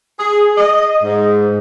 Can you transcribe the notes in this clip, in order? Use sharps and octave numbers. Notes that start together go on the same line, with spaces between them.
G#4
D#5
G#2